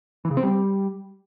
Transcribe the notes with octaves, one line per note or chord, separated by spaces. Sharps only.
E3
C#3
C4
G3